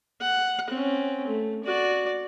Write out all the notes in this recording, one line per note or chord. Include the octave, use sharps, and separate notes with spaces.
F#5
C4 C#4
A3
F#4 D5